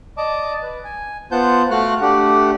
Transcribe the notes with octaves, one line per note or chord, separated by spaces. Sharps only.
D5 D#5 A5 D6
B4
G#5
B3 F4 C5 F#5 A5 G6
A3 F#4 F5 F#5 F6 F#6
A3 D4 G4 F#5